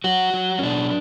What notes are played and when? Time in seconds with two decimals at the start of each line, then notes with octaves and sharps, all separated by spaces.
0.04 F#3 F#4
0.33 F#3
0.59 C#4
0.63 B2 D4